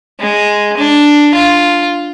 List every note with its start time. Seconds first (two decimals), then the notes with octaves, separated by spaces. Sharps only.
0.20 G#3
0.78 D4
1.35 F4